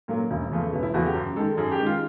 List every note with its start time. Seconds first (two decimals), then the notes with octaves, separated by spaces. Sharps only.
0.08 A#2 F#3 A#3
0.31 E1
0.51 E2 C#3 F3 A3
0.73 E1 B3
0.83 E4
0.94 E2 C#3 F3 A3 F#4
1.05 G4
1.15 F#2
1.36 D#3 G#3 A4
1.57 F#2 G#4
1.71 G4
1.80 D#3 G#3
1.86 F4